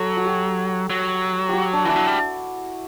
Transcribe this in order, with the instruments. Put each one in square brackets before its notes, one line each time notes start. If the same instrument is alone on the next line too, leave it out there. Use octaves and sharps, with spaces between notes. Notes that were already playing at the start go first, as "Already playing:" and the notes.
Already playing: [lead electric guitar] F#3 [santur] A4
[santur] F#4
G4
[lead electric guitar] F#3
[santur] F#4 G4
D4
[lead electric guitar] E3 [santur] E4
[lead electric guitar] F#3
G3